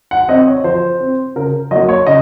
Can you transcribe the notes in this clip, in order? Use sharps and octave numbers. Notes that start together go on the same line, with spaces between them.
F#5
C4 D#5
C#5
F3 C5
C4
C#3 A#4
F#3 A#3 D#5
C#5
C#3 D#5